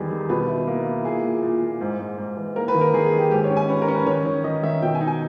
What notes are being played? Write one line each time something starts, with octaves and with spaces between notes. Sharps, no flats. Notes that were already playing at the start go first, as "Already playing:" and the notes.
Already playing: E2 D#3 G3 G#4
D#3
B2 B4
E4
A#3
E4
A#2 G#4
A#2
A#2
A#2
G#2
G#2
G#2
E3
A#3 A#4
B4
D#3
A#4
D#3 G#4
G#4
D#3
G4
G#2 G4
C#5
C#4
G#5
C#4 B4
A#4
C#4
B4
D#3 C#5
D#3 C#5
D#3 D#5
D#3 E5
B2 G5
G#5
D#4
G#5